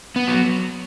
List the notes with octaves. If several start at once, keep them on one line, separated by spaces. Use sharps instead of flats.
B3
F#3